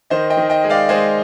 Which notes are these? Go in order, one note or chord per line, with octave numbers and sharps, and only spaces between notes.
D#3 C5 D#5
D#5 G5
D#3
D#5 G5
G#3
D5 F5
G#3 C5 D#5